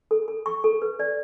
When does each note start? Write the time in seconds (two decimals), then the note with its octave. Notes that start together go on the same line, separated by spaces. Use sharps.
0.11 A4
0.28 A4
0.46 C#6
0.64 A4
0.82 B4
1.00 D5